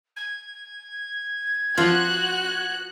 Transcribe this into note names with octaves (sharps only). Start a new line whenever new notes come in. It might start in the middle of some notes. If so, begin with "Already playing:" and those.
G#6
F3 F4 F#4 F#6